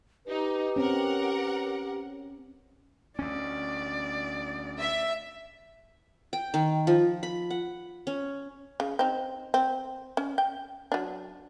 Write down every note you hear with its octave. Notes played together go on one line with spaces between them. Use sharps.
D#4 G4 B4
C4 C#4 A#4 F#5
D2 C#4 D5
E5
G5
D#3
F3
B5
F#5
C#4
C#3
C4 D#4
C4
C#4
G5
F#3 D4